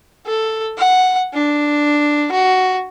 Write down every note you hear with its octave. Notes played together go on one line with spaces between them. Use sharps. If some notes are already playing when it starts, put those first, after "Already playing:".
A4
F#5
D4
F#4